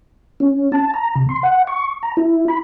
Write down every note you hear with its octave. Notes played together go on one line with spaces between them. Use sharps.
C#4
A5
A#5
C3
C6
F#5
C#6
A#5
E4
B5